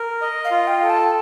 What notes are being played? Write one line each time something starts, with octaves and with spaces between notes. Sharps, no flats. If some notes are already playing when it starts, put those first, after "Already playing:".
Already playing: A#4
D#5
F5
F4
G5
A4
A5